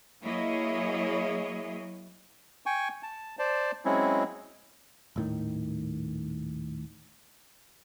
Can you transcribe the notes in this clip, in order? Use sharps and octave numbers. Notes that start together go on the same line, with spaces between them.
F#3 A#3 E4 G#4 C#5 D#5
G5 G#5 C#6
A5
C5 D5 A5
F#3 G#3 C4 C#4 E4
D#1 A2 D#3